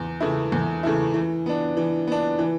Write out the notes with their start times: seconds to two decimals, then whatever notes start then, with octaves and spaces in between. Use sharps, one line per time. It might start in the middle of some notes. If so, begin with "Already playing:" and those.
Already playing: E2
0.20 C#3 E3 A3 E4
0.52 E2
0.83 C#3 E3 A3 E4
1.14 E3
1.46 B3 D4
1.77 E3
2.07 B3 D4
2.39 E3